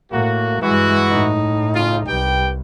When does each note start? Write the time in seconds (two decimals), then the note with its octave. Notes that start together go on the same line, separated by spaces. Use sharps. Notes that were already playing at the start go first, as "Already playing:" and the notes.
0.12 A2 A#3 F#4
0.62 G2 E3 G#3 E4 F#4
1.11 A2 D#4
1.75 C#3 F4
2.08 C2 G4 B4 G5